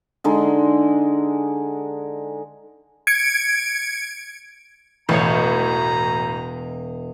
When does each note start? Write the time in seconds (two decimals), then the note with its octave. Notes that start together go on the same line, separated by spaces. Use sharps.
0.24 D3 G#3 D#4
3.07 G#6 C#7 D7
5.09 E1 A1 A2 C#5 A#5